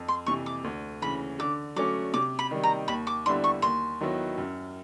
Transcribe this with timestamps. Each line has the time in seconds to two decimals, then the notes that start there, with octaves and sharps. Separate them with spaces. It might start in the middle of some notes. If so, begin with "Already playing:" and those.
Already playing: F2
0.08 C6
0.26 C3 E3 C#6
0.46 D6
0.64 D2
1.02 C#3 E3 B5
1.39 D3 D6
1.76 F#3 A3 C#4 D6
2.14 C3 D6
2.39 B5
2.51 D#3 G3
2.63 A#5
2.88 D#2 B5
3.07 D6
3.26 D3 G3 B3 E4 C6
3.44 C#6
3.62 D#2 C6
4.01 D#3 F#3 B3 E4
4.38 F#2